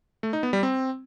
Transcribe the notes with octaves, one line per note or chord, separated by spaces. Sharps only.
A3
D#4
B3
G3
C4